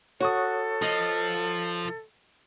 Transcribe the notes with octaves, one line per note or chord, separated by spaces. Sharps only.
F#4 A4 C#5 C#6 D#6
F3 D#5